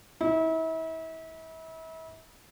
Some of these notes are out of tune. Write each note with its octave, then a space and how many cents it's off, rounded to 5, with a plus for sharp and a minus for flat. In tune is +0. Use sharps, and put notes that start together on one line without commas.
E4 -35